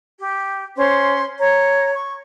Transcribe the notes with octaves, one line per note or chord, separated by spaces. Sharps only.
G4
C#4 C5 C6
C#5 A#5
C#6